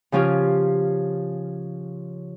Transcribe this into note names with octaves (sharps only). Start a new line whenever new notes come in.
C#3 F3 C#4 F4 G4